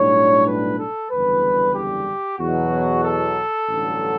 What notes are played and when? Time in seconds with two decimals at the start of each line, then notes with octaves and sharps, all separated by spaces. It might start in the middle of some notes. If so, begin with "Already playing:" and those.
Already playing: B1 A2 G3 D4 C#5
0.46 B4
0.78 A4
1.10 F#1 E2 D3 G3 B4
1.75 G4
2.39 E2 B2 F#3 F#4
3.03 A4
3.68 A1 G2 D3 F#3